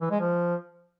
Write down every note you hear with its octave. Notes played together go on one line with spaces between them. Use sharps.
E3
G#3
F3